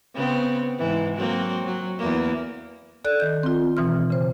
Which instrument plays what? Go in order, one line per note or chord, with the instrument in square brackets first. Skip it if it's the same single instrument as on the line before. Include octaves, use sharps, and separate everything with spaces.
[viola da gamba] C#3 B3 C4
G#2 E3
F#3 A#3 C4
F#3
E2 A#3
[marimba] A4 D5 F#6
D#3 G6
C4 F4
B2 E3 C4 F6
C#3 C5